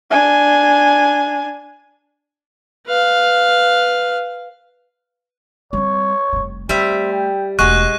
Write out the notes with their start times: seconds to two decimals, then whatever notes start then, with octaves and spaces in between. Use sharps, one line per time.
0.11 D4 G#5
2.87 B4 F5
5.73 G3 C4 C#5
6.33 F1 G3
6.69 G3 A3 C4 E5
7.12 G5
7.59 E1 G#3 A3 F#4 G#4 C#6 F#6 D#7